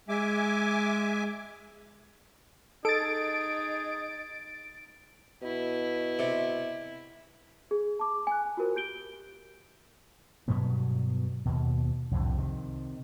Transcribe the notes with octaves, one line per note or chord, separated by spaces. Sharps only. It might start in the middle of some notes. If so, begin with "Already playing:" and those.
G#3 E5 G#5 D6
D#4 G#4 A4 A6 D7
B2 E4
C3
G#4
A5 D6
G#5 F#6
F4 F#4 A#4 C5
G4 G6 D7 G7
G2 B2 F#3 B3
D#2 B2
C2 F2 A2 D3
C3 D#3